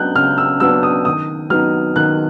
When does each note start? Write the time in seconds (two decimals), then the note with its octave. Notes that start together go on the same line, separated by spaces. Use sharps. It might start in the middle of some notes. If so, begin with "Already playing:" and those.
Already playing: F#3 B3 D4 F#6 G6
0.16 C#3 F6
0.38 E6
0.60 F#3 B3 D4 E6
0.83 D#6
1.05 D#3 D#6
1.50 F#3 B3 D#4 F6
1.96 D#3 F#6